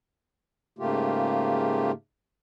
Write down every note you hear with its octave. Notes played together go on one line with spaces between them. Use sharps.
G#2 C#3 A3 A#3 F4 G4